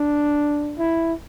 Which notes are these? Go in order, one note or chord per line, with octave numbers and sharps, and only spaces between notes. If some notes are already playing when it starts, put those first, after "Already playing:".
Already playing: D4
E4